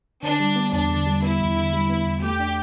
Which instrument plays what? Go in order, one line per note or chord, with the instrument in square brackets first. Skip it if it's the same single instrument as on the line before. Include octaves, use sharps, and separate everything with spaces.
[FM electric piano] D3 [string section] D4
[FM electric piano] G3
B3
[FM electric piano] E2 [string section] D4
[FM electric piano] D3
G3
[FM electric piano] B3 [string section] E4
[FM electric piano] E2
D3
G3
B3
E2
[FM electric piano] A3 [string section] G4
[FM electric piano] D4